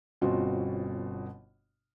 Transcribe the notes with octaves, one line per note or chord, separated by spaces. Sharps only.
G1 B2 C4 C#4 F4 F#4